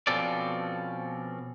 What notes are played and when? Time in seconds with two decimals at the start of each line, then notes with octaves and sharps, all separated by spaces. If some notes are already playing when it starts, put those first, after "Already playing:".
0.07 B2 F3 C4 C#4 A4 D5